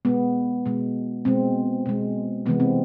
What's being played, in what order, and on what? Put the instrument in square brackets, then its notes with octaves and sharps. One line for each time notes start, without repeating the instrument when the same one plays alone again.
[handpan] B2 G#3 B3
B2 G#3
B2 G#3 C4
B2 G#3
C3 E3 G#3 B3
C4